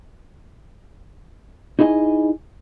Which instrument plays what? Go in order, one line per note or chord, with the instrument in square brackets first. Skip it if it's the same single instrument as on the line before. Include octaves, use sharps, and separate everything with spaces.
[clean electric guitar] D#4 E4 G#4 D#5 G#5